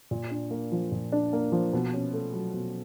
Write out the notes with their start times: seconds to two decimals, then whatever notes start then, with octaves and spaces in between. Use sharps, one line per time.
0.11 A#2
0.31 D4
0.51 A#3
0.72 F3
0.92 A#2
1.12 D4
1.33 A#3
1.52 F3
1.73 B2
1.94 C#4
2.13 A3
2.33 F#3
2.54 B2